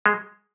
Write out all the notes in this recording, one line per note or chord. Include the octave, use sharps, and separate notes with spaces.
G#3